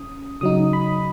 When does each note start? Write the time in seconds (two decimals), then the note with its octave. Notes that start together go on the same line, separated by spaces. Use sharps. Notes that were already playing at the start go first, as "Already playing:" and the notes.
Already playing: C#4 D#6
0.41 C#3 F#3 D#4 D#6
0.73 B5